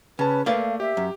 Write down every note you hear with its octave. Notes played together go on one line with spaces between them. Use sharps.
C#3 C#4 B4 A5
A3 A#3 B4 D5 F5
G4 E5
F#2